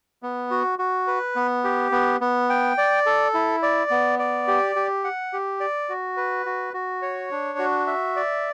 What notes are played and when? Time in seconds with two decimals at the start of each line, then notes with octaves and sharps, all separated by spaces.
0.23 B3
0.51 F#4
0.79 F#4
1.07 B4
1.36 B3
1.64 G4
1.92 B3
2.21 B3
2.50 G5
2.78 D5
3.06 A4
3.34 E4
3.62 D5
3.91 B3
4.19 D5
4.48 G4
4.76 G4
5.04 F#5
5.33 G4
5.60 D5
5.89 F#4
6.17 B4
6.46 F#4
6.74 F#4
7.02 C#5
7.31 D4
7.59 F#4
7.87 E5
8.16 D5